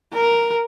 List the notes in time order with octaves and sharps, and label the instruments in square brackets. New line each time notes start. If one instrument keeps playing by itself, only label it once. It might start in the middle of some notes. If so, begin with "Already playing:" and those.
[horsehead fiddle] A#4